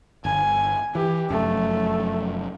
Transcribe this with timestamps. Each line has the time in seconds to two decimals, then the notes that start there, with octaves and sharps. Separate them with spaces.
0.25 G1 G#5
0.95 E3 G4
1.30 F1 F#2 A3